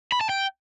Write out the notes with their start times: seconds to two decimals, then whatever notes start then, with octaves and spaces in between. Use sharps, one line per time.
0.12 B5
0.21 A5
0.29 G5